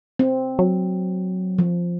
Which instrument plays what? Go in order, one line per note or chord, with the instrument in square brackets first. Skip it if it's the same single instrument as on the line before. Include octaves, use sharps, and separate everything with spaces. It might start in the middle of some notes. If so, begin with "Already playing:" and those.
[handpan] C4
[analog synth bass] F#3
[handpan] F3